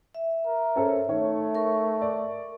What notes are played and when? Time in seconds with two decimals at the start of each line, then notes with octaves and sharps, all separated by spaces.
0.15 E5
0.46 A#4
0.75 C#4 A4 C5
1.08 D#3 A3 C#5
1.55 A#4 C#6
2.02 D5